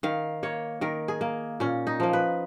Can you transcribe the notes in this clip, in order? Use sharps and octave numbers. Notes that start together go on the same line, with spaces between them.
D#3 F5
A#3 C#5
D#3 A#4
G#4
A#3
A#2 C#4
D#4
F3 A#3
B4